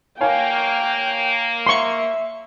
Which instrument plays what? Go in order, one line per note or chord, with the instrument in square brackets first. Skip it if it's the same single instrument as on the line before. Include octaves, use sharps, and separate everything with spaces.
[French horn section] A#3 [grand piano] C#5 F5 G#5 [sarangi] G5
[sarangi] E5 [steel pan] C6 C#6